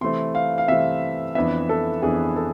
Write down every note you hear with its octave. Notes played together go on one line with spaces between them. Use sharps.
C3 E3 A3 C4 C6
F5
F5
C3 E3 A3 C4 E5
F2 E3 B3 D4 E5
A4
F2 E3 B3 D4 G#4
A4